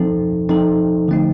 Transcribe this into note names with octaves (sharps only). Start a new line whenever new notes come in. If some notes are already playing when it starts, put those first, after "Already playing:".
Already playing: F3 C4 D#4 A4
F3 C4 D#4 A4
D3 F3 A3 C4 D#4